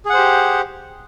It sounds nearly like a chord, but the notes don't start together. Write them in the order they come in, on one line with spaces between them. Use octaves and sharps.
G#4 F#5 C5 G4